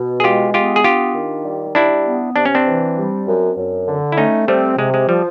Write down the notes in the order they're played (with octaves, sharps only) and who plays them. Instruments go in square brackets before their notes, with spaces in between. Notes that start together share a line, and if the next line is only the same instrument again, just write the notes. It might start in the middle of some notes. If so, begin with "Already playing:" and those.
Already playing: [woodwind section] B2
[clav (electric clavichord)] G#4
[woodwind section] G#3 [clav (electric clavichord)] F4 G4
[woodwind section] B3 [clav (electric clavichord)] F4 G4
[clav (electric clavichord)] G#4
[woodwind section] D4 [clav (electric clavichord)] F4 G4
[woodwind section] D#3
G3
[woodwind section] G3 [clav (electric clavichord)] D4 E4
[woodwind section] B3
[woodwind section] C3 [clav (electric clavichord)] D4
[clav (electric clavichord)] C#4
C4 D4
[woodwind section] E3
G3
F#2
F#2
D3
[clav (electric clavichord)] E4
[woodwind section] A3 [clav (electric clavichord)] C#4 D#4
[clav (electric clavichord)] G3 A3 [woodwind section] C4
[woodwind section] C3 [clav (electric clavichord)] G#3
[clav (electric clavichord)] G#3
[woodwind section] F3 [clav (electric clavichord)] G3